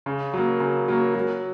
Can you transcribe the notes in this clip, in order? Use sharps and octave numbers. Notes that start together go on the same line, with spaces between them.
C#3
F#3 A#3
C#3
F#3 A#3
F#3